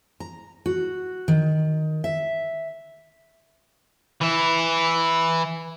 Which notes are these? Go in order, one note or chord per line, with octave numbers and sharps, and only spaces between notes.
A#5
F#4
D#3
E5
E3 E4